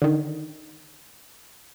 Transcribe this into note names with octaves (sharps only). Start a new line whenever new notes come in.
D3 D#3